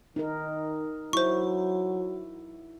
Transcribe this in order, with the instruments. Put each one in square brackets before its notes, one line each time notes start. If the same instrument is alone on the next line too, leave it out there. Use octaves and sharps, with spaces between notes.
[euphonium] D#3 [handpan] D#4 A#4
[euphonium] F#3 [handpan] E4 [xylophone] C5 C#6